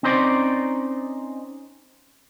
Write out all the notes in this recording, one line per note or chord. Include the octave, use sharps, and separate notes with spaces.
C4 C#4 D#4 C5 D5